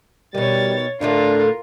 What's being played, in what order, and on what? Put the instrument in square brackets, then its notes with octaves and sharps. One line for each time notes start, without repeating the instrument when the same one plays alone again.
[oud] B2 D#3 [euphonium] G3 [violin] C#5 A6
[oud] A2 D3 A3 [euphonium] D4 [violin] F4 A#4